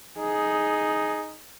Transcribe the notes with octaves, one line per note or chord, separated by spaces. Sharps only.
D#4 G#4